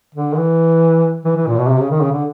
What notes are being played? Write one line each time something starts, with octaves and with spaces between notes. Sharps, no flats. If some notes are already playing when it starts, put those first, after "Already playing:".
D3
D#3
E3
E3
E3
A#2
B2
C3
C#3
D#3
C#3
D3